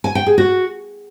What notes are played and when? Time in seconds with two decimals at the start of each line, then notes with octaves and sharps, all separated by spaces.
0.04 G#5
0.15 G5
0.26 G#4
0.38 F#4